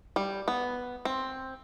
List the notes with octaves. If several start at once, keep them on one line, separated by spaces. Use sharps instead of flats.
G3
B3
C4